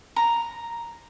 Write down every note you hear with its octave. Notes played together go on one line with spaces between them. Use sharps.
A#5